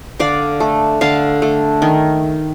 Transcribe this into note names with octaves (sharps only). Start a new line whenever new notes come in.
D3 D5 F5
A3
D3 F5 A5
A3
D#3